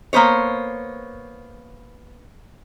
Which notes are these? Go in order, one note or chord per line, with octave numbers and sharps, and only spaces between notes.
A#3 B3 C5 C#5